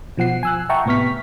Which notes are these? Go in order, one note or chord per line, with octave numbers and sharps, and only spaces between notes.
B2 F3 F#5 C7
G#5 E6 F#6
E5 F#5 G5 A5 A#5 C#6
A2 C3 B3 C#6 F6 B6